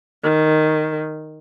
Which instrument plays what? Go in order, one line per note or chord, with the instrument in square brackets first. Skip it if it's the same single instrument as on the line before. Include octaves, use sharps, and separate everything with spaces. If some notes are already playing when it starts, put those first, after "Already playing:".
[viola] D#3